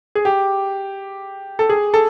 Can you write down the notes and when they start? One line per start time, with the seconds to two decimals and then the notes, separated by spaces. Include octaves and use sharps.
0.15 G#4
0.25 G4
1.59 A4
1.69 G#4
1.94 A4